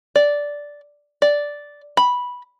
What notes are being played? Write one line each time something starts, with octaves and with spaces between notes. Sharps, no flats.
D5
D5
B5